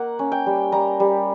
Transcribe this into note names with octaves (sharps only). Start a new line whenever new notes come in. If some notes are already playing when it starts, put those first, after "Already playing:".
Already playing: A#3 F#5
C#4
G5
G3
G3 A#5
G3